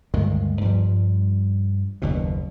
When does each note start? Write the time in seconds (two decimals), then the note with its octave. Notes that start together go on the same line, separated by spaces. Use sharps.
0.14 D2 G2 D#3 G#3
0.61 G2 F3 G3
2.02 F#1 D#2 B2